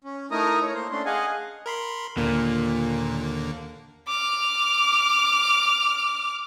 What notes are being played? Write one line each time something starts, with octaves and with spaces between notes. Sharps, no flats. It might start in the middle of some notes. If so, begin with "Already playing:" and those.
C#4
A3 D#4 E4 A#4 A#5 D#6
C#5
A#3 C5
A3 C#4 D4 C6
G#4 D#5 F5 F#5 G#5
A#4 B5 C6
D#2 A#2 D3 A#3
D6 F6